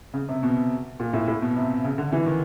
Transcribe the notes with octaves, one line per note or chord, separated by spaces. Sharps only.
C#3
C3
B2
A#2
A2
A2
B2
C3
C#3
D3
E3
D#3